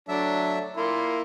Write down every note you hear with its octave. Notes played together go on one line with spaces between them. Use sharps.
F#3 A3 D4 E5
A#3 E4 C6